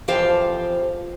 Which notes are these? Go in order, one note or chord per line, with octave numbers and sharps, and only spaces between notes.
F2 E3 F3 G4 C5 F5